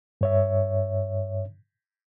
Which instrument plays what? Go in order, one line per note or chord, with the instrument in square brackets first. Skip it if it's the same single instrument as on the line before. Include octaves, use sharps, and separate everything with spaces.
[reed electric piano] G2 C#5 E5